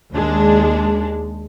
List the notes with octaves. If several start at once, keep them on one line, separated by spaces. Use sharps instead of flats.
D#2 G#3 D4